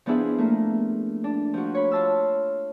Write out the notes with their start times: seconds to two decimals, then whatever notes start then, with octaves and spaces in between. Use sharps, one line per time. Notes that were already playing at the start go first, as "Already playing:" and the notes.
0.06 F3 B3 D4 E4 G#4 B4
0.38 A3 A#3
1.24 D4
1.54 F3 F#4
1.75 C#5 B5
1.92 F4 A5 E6